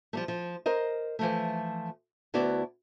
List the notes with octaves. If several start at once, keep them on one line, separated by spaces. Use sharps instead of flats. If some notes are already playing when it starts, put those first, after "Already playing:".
F3 G3 A3
F3
A#4 C5 D#5
E3 F3 A3
D2 B3 E4 F#4 D5